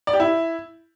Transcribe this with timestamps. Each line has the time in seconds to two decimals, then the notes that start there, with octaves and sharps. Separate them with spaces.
0.07 D5
0.14 G4
0.20 E4